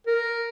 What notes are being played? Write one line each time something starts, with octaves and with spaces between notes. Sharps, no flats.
A#4